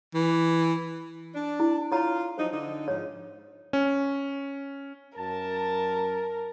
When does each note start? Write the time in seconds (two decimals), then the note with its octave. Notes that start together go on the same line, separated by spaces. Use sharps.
0.14 E3
1.34 D4
1.60 E4
1.92 F4 C#5 A#5
2.38 F3 F#3 D#4 C5
2.52 D3 D4 D#4
2.88 G#2 F3 C#5
3.73 C#4
5.18 F#2 A#4 A5